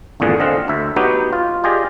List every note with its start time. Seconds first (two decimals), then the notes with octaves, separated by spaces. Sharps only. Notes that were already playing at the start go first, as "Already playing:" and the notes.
0.20 G#1 E2 A#2 D3 G#4 F#5
0.40 D3 C4 D#5 F5 F#5
0.68 D2 E5
0.96 F#3 B3 D#4 F#4 G4 G5
1.33 F4
1.64 F4 G4 G#4 D5 D#5